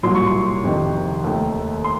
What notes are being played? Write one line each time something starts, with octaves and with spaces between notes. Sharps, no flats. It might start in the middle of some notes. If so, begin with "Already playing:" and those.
C2 A#2 F#3 C6
C#6
C6
F2 C3 D#3
D#2 D#3 A3
C6